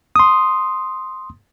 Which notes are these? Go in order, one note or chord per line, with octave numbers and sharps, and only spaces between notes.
C6 D#6